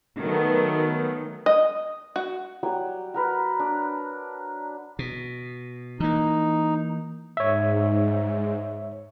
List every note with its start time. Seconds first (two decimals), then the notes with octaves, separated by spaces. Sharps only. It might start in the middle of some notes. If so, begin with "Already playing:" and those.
0.19 D#3 F#3 A3 B3
1.46 D#5
2.16 F#4
2.63 F#3 G3 F#5 G5
3.14 F#4 A#4 B4
3.60 D4
4.99 B2
6.00 E3 A#3 D#4
7.37 G#2 C#5 E5